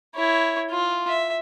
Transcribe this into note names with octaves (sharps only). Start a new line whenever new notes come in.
E4 C#5
F4
E5